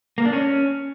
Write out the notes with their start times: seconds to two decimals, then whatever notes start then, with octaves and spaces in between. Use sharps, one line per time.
0.18 A#3
0.25 D4
0.33 C#4